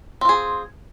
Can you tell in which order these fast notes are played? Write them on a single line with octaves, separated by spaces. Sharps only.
C4 F4 G#4